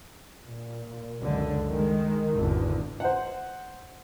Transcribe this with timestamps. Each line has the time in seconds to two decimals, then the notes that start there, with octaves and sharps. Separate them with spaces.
0.41 A#2
1.21 C#2 F#2 D3 G#3
1.69 D#3 G#3
2.35 G#1 E2 D3
3.00 C5 F#5